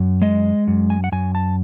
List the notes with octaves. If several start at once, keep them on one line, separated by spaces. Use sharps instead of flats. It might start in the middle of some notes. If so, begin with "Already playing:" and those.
Already playing: F#2
G#3 D#5
F#2
G#5
F#5
F#2 G#5
A5